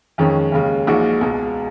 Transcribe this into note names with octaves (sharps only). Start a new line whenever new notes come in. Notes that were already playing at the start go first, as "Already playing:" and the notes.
F2 D#3 G#3 C#4
D#2 C#3 G#3
A#1 A#2 G#3 D#4 F#4
C#2 B2 G#3